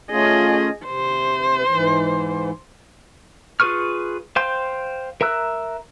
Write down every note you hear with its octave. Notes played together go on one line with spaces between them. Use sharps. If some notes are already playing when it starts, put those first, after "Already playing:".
A3 C#4 F4 G#4 D#5
C3 C5
G#2 E3
F4 G#4 B4 C#6 F6
C5 F5 G5 C6 G6
A#4 E5 A#5 E6 F#6